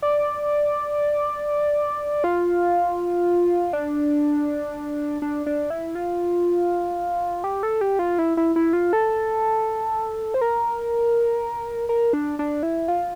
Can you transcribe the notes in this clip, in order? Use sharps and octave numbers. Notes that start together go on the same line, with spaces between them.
D5
F4
D4
D4
D4
E4
F4
G4
A4
G4
F4
E4
E4
E4
F4
A4
C5
A#4
A#4
D4
D4
E4
F4